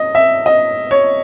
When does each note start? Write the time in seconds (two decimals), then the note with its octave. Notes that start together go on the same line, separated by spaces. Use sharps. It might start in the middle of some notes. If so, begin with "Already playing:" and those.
Already playing: D#5
0.15 E5
0.46 D#5
0.91 C#5